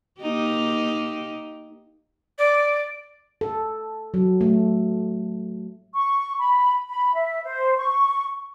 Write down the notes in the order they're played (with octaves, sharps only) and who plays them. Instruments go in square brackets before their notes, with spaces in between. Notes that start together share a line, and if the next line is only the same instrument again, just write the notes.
[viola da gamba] A#3 D#4 G4
[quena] D5
[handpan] A4
F#3
A3
[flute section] C#6
B5
B5
E5
C5
C#6